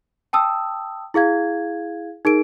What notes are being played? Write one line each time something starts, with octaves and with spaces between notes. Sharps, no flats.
G5 A5 D#6 E6
E4 G#4 F5 G#6
D#4 G#4 A#4 D7